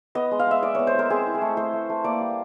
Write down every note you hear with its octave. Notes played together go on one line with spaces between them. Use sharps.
B3 D#5
G#3
F5
G#3 E5
G#3 D5
B3 C#5
C5
G#3 A#4
C4 G#4
E4
G#4
A3
A3 C5
A3
A3
A#3 D5
G3